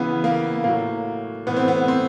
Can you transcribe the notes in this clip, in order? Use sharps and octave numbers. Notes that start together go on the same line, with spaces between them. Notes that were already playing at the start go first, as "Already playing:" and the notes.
Already playing: C#3 E3 B3
A#3
A2 F#3 A#3
A2 E3 B3
C4
B3
C4